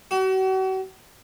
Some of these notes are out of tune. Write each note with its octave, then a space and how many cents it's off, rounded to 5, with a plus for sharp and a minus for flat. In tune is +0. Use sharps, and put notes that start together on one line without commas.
F#4 +40